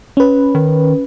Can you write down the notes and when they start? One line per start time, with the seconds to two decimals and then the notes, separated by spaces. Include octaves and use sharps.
0.17 C#4 B4
0.55 D#3